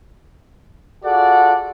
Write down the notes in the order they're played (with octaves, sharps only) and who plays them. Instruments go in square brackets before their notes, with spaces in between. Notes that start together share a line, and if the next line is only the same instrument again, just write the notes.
[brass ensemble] F4 F#4 G#4 A4 D5 F#5